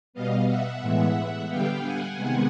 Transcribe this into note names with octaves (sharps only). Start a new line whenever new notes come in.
B2 G3 B3 D#5 F5
E5 F#5
A2 E3 G#3 B3
D3 G3 B3 F5 G5
F#5 G#5
C3 D#3 G#3 B3